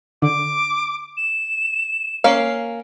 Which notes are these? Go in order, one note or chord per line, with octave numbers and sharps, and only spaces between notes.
D3 D6
E7
A#3 C#4 F5